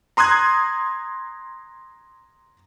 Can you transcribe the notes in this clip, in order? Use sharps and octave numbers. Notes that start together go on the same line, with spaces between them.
A#5 C6 D#6 F#6 G#6